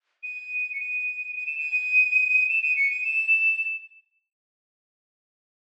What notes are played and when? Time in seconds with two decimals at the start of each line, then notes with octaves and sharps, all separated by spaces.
0.23 D#7
0.73 C#7
0.80 D#7
1.36 D#7
1.47 E7
1.58 D#7
2.49 E7
2.63 D#7
2.77 C#7
2.91 D#7
3.05 E7